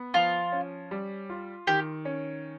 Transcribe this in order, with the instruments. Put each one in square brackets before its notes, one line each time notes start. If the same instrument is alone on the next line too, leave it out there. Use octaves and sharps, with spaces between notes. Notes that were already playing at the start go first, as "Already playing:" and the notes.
Already playing: [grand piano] B3
[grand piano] F3 [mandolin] F4
[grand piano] C#4
G3
F4
[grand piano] D#3 [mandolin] G4
[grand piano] C#4